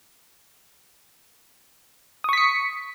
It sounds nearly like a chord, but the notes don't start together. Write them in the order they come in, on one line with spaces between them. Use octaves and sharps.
D#6 C#6 B6 C#7